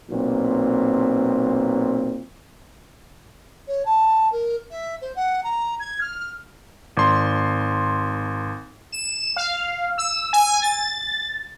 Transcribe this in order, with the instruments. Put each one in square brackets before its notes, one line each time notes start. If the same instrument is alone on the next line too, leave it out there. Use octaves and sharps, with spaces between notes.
[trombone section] B1 A#2 C4
[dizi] C#5
A5
A#4
E5
C5
F#5
A#5
G#6
F6
[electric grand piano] G#1 C6
[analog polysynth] E7
F5
E6
G#5
A6